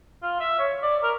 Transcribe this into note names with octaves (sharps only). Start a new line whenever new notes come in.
F4
E5
C#5
D5
A#4